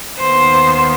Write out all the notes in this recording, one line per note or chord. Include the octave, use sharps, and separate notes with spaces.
D#2 D#3 B3 C5